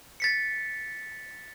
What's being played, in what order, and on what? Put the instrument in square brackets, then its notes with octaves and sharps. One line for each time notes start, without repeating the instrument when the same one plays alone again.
[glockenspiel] A6 B6 C#7